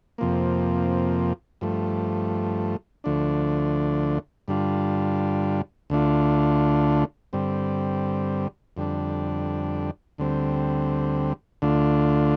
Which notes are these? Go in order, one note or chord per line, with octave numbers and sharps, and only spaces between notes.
F2 C3 F3 A#3
G2 F3 A3
D2 D3 F3 A3 D4
G2 D3 G3 D4 F4
D2 D3 A3 D4 F4
G2 D3 G3 C4
F2 D3 G3 D4
D2 D3 G3 C4
D2 D3 A3 D4 F4